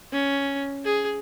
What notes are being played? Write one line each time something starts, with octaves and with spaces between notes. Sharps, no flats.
C#4
G#4